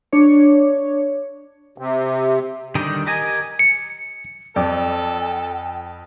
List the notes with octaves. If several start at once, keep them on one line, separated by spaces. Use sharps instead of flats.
D4 C#5
C3
D3 D#3 G3 D#4 G5
G4 A#4 D#5 G#5
C#7
F2 A4 D5 G5